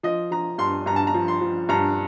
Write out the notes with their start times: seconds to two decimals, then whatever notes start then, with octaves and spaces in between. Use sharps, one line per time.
0.03 F3 D#5
0.31 F3 A#5
0.58 G2 C6
0.86 G2 A#5
0.96 A5
1.07 A#5
1.14 F3
1.28 C6
1.41 F3
1.69 G2 A#5